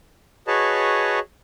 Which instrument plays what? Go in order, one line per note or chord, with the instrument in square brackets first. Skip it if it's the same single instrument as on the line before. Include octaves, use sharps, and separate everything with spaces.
[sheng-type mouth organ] F#4 G#4 B4 C#5 D#5 A5